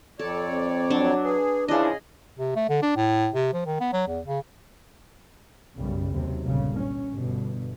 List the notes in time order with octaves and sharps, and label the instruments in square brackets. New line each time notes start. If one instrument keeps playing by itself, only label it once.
[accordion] F2 C#5 D5 [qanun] A4
[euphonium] C4
[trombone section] F#3 [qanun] D4
[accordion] G#4 [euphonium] B4
[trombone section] C#3 E3 D4 [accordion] F3 [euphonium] E4 [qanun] G#4 D#5
[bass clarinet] C3
A3
D3
D4
A2
C3
F3
D#3
B3
F#3
E2
C#3
[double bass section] B1 F#2 C#3 G3
D#2 C3 F#3
G1 C2 A#2 C#3
C#4
G1 G2 B2